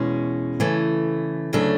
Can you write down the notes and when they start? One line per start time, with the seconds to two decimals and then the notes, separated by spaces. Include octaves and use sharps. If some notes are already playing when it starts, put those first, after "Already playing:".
Already playing: E2 B2 G#3 C#4
0.60 C#3 E3 A3
1.53 D2 C#3 F#3 A3 D4